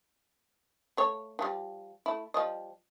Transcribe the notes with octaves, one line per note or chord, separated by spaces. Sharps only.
A3 C#5
E3 F3 G3
A3 E4
F3 G3 D#5